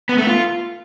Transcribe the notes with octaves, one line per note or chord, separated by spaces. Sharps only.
B3
A3
F4